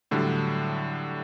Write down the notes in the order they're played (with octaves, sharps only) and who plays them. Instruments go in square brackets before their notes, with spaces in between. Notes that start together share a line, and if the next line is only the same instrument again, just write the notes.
[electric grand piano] A2 D3 F#3 G3 D4